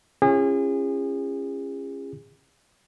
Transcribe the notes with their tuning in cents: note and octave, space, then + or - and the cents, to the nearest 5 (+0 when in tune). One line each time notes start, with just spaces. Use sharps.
C#4 -20 F4 -45 G#4 -35